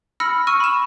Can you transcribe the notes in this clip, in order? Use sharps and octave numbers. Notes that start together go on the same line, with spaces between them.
B5 E6 F6 A#6 C#7 F#7
C#6 E6 F6 D#7
B5 E7